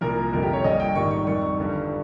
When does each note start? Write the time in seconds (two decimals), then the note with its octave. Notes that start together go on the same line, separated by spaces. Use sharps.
0.01 C2 A#2 F3 A#4
0.33 G1 F2 C3 A#4
0.43 G4
0.53 C#5
0.64 A#1 A#2 G3 D#5
0.80 G5
0.95 G#1 G#2 D#3 G3 C#6
1.11 C#6
1.26 F2 D#3 G3 C#6
1.57 G1 G2 G3